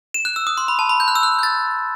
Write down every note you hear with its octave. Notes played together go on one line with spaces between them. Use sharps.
E7
F#6
E6
D#6
C6
B5
A5
B5
G6
F#6
E6
F#6
G6
A6